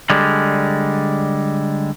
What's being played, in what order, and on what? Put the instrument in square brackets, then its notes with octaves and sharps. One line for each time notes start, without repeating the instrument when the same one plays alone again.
[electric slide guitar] D3 G3 G#3